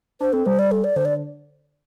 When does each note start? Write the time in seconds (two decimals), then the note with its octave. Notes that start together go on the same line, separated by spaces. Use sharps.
0.20 D4 C5
0.33 C4 A4
0.46 G3 C5
0.59 D5
0.71 A4
0.84 D5
0.96 D3 C5
1.05 D5